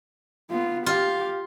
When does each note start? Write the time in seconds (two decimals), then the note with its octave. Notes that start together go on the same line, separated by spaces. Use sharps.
0.51 B3 F4
0.86 F4 G4 F5